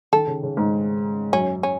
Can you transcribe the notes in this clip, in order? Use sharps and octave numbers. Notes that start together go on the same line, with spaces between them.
D#3 A4
C#3
C#3
G#2
F#2 C#4
C#4